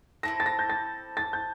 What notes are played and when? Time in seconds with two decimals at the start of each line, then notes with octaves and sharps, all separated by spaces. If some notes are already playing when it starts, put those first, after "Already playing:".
0.23 C4 E4 A4 A#6
0.40 A6
0.46 A#6
0.59 G6
0.70 A6
1.17 A6
1.33 G6